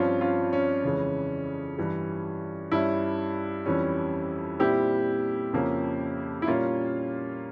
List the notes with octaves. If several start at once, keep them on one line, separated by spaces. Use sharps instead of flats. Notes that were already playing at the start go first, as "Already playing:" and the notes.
Already playing: G2 F3 C4 C#4 F4
C#4 F4
C#4
F2 C#3 E3 G#3
G2 E3 G3
G2 G3 C#4 E4
F2 E3 G3 C#4
A#2 G3 C4 E4 G4
F2 C#3 F3 A#3 C#4
E4
A#2 G3 A#3 C#4 F4